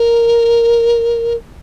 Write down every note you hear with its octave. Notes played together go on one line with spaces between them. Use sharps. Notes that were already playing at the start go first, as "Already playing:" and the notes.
Already playing: A#4